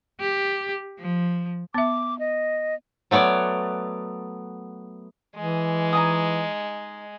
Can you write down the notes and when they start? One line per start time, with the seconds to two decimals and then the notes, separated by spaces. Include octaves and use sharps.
0.20 G4
0.99 F3
1.74 B3 E5 D6
2.19 D#5
3.11 F#3 A3 B3 C#5 D5
5.36 E3 G#3
5.93 D#4 G#5 D#6